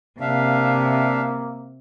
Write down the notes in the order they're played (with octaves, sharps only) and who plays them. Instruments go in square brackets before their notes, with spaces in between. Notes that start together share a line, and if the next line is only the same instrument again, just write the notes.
[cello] C3 [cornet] A#3 [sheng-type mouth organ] D4 E5 F5